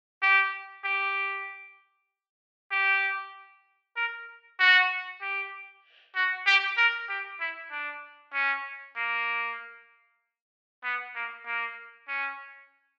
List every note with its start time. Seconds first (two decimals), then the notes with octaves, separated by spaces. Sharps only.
0.22 G4
0.84 G4
2.71 G4
3.97 A#4
4.59 F#4
5.22 G4
6.16 F#4
6.47 G4
6.78 A#4
7.09 G4
7.40 E4
7.71 D4
8.33 C#4
8.96 A#3
10.84 B3
11.15 A#3
11.46 A#3
12.08 C#4